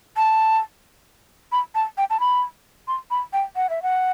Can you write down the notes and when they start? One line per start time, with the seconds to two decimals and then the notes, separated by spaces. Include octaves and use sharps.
0.17 A5
1.52 B5
1.75 A5
1.98 G5
2.10 A5
2.20 B5
2.88 C6
3.11 B5
3.33 G5
3.56 F#5
3.70 E5
3.83 F#5